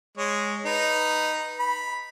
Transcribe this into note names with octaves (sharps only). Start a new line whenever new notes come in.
G#3 C#5
D#4 B4
B5